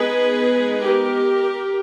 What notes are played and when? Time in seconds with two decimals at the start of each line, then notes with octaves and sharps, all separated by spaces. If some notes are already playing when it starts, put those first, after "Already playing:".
Already playing: G#3 B3 D#4 G#4 B4
0.81 G4 A#4